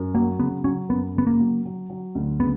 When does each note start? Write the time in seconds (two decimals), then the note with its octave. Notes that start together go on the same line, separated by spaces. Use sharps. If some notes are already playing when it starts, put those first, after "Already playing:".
Already playing: F#2
0.14 F#3 A#3
0.39 C#3 B3
0.64 F#3 C#4
0.89 F#2 B3
1.15 C#3 B3
1.27 A#3
1.40 F#3
1.65 F#3
1.90 F#3
2.15 D2
2.39 C#3 B3